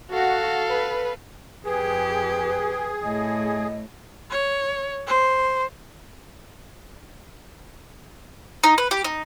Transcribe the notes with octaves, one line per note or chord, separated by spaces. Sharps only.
F#4 A4 F5
B4
F2 G4 G#4 B4
A2 D#5
C#5
C5
D#4
B4
G4
D#4